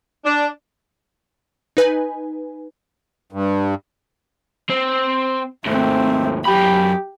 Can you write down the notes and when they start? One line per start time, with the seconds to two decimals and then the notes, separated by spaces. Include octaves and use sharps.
0.25 D4
1.77 D#4 B4 G#5
3.33 G2
4.70 C4
5.65 D#2 G#2 A3 C4
6.45 F#2 G4 B5